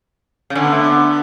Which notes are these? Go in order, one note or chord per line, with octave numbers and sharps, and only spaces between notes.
C#3
D3 C#4
B3
A3
B3